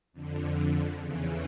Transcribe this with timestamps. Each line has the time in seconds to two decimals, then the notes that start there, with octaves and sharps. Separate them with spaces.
0.13 F2 D3
0.98 E2 C#3 E3